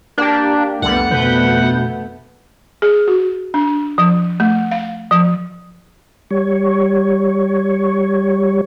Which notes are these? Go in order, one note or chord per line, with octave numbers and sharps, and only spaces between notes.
A#3 D4 G4
C2 F2 D3 G3 A3 B3 F#5
D2 B2 B4 G6
G#4
F#4
D4
F3
A3
F5
F3
G3 C#5